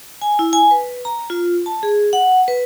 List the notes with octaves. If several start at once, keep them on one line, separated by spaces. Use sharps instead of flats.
G#5
E4
G#5
B4
A#5
F4
A5
G#4
F#5
B4